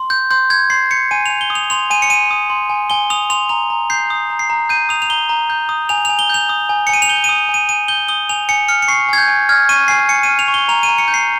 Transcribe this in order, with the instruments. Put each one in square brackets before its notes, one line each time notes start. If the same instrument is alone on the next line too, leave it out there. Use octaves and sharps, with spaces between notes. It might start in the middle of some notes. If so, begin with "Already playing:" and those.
Already playing: [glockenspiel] C6
G6
C6 G6
G6 G#6
C6 C7
G6 C#7
G#5 D#7
G#5 F7
G7
D#6
F7
C6 F7
G#5 D#7
C#7
G#5 D#7
D#6
C6
G#5
G#5 G7
D#6 F7
C6 F7
A#5 F7
A#5
G6 C7
D#6
A#5
C7
A#5
G6 D#7
D#6 F7
F7
A#5 G7
A#5
G6
D#6
G#5 F7
G#5 F7
G7
G6 F7
D#6
G#5
C#7
G#5 D#7
F7
G6 G7
D#7
D#6
G#5
D#7
G#5 D#7
G6 G7
D#6 G7
G#5 F7
G#5 C#7
F6 C#7
C#7
C#6 C7
G#5 G#6
G6
G#5
F6 G#6
C#6 D#7
G#5 C7
G#5 C#7
D#7
F6
F7
C#6
G7
A#5 F7
D#7
A#5
C#7
G6
C7